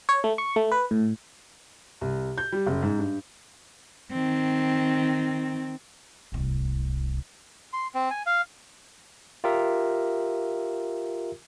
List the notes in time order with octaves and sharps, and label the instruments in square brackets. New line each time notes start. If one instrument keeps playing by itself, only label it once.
[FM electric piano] C#5
A3
C#6
A3
B4
A2
[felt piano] C2
G6
G3
F#1
G#2
G2
[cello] D#3 C4
[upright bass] D1 C2
[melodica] C6
C4
G#5
F5
[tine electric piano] F4 G4 A#4 E5